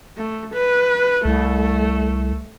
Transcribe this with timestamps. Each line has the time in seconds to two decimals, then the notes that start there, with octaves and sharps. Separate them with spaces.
0.18 A3
0.54 B4
1.25 C2 A3